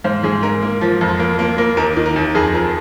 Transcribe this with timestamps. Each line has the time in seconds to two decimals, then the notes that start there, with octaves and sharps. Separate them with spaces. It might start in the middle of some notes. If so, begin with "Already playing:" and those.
0.04 G#2 C5 F5
0.24 G#2 G#4
0.43 G#2 A#4
0.62 A#3
0.81 F3
1.01 F2
1.19 A#3
1.39 A#3
1.58 A#3
1.77 D#2 A#4
1.96 D#3
2.06 A#4
2.16 D#2
2.35 F2 G#4
2.54 F3 A#4